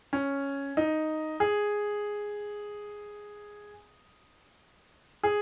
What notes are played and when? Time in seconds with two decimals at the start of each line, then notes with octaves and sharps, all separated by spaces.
0.13 C#4
0.77 D#4
1.40 G#4
5.23 G#4